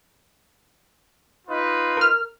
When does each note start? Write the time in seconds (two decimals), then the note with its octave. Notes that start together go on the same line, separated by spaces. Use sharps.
1.46 D#4 F4 B4
1.97 A#4 F6